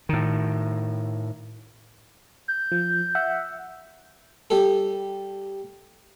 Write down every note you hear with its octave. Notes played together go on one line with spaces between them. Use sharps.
A2 D#3
G6
F3
E5 F#5
G3 A4